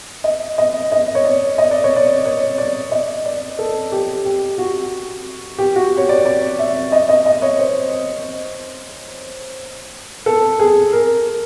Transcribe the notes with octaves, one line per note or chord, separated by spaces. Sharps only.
D#5
D#5
D#5
C#5
D5
D#5
D5
C#5
D5
C#5
D5
D#5
D5
A4
G4
G4
F#4
G4
F#4
C#5
D5
D5
E5
D#5
D#5
D#5
C#5
C5
A4
G#4
A#4